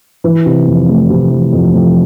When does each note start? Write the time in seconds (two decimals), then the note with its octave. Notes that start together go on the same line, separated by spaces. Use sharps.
0.24 E3
0.46 C3
0.67 F2
0.89 A3
1.10 C3
1.31 E3
1.53 F2
1.74 F2